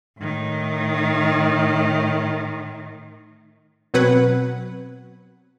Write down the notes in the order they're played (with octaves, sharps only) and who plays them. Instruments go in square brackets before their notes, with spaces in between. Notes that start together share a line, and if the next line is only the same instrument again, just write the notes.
[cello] A2 D#3
[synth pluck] B2 F#3 C4 B4 F#5 G#6